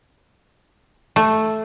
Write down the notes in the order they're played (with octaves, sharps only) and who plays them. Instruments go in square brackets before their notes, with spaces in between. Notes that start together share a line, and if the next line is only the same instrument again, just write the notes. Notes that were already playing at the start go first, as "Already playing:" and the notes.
[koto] A3